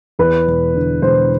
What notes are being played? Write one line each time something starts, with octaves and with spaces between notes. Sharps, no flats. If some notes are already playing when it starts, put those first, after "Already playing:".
E2 B4
E1
D3
E1 C5